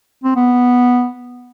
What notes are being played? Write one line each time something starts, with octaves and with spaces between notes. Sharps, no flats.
C4
B3